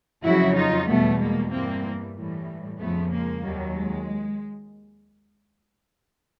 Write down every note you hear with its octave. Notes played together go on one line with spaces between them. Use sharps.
F2 C#3 F#3 E4 F#4
D#4 F4
E2 B2 G3 A3 B3
G#3 A#3
G2 E3 G3 A#3 C4
A2 E3 G3
F2 C#3 F3 A3 B3
G#3 A#3
D#2 D#3 F#3 G3
G#3